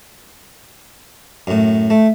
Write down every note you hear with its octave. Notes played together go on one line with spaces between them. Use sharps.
F#2 A2
A3